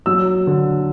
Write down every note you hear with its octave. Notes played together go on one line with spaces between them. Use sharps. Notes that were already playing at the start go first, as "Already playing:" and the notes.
F#3 E6
D3